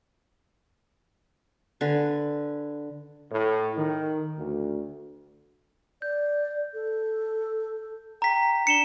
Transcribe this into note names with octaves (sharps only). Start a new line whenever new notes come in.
D3 B4 G#5
A2
D#3
D2
D5 G6
A4
G5 A#5 B6
D4 C#7 E7 G7